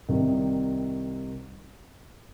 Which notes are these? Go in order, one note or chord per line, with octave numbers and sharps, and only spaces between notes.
C2 C3 D#3